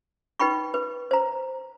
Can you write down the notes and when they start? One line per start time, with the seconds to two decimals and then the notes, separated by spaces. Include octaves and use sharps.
0.40 D#4 B4 G5 B5 C#6
0.74 B4
1.11 C5 A#5